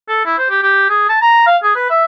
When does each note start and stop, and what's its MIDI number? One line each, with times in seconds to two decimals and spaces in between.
0.08 0.23 69
0.25 0.33 64
0.38 0.48 72
0.50 0.59 67
0.62 0.89 67
0.89 1.04 68
1.09 1.18 81
1.21 1.43 82
1.46 1.57 77
1.63 1.72 68
1.75 1.85 71
1.90 2.04 76